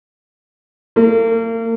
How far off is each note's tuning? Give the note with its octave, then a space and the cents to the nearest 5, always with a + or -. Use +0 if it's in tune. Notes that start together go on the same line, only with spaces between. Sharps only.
A#3 -40